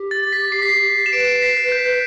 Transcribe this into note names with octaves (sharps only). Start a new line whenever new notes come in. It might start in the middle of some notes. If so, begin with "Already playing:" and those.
Already playing: G4
A6
B6
C7
B6
C7
E7
B4 D7
C7
B6
B6
G6